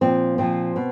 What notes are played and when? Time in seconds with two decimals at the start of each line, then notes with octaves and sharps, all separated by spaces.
0.01 A#2 F3 C4
0.38 A#2 F3 C4
0.76 B2